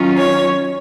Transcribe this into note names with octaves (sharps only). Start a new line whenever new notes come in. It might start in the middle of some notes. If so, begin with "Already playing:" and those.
Already playing: D#3 F#3 C#4 F4
C#5